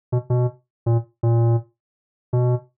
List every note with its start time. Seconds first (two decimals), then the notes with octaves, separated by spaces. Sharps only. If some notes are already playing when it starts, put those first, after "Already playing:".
0.12 B2
0.30 B2
0.86 A#2
1.23 A#2
2.33 B2